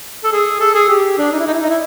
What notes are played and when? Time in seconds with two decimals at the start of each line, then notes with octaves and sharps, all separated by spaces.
0.24 A4
0.32 G#4
0.60 A4
0.75 G#4
0.89 G4
1.18 D4
1.32 D#4
1.39 E4
1.46 D#4
1.54 E4
1.62 D#4
1.69 E4